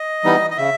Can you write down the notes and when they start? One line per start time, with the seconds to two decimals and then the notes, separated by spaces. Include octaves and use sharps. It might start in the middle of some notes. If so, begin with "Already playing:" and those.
Already playing: D#5
0.24 E3 G3 B3 D#4
0.50 D#5
0.57 C#3 E5